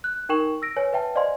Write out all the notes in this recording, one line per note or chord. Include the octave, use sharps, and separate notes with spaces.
F#6
D#4 A#4 G5 C#6 E7 F#7
E6 A#6 D7
B4 C#5 G#5
B4 E5 G5 A5
C5 D5 D#5 F5 G#5 C6